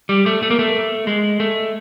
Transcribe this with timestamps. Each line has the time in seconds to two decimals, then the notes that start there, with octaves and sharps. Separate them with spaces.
0.09 G3
0.26 A3
0.43 A3
0.50 A#3
0.59 A3
1.07 G#3
1.40 A3